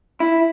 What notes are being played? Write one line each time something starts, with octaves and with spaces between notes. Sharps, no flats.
E4